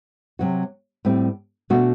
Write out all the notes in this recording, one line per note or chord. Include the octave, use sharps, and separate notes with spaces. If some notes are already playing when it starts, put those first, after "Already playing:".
C3 F#3 C4 F#4
A2 G3 C4
B2 A3 D4 F#4